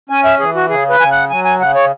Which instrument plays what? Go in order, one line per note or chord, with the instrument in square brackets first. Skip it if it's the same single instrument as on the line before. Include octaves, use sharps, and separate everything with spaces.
[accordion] C#4 G#5
E5
E3 G#4
F#4
C#3 G#4
B4
C#3 G#5
F#5
F#3 G#5
G#5
C#3 F#5
C#5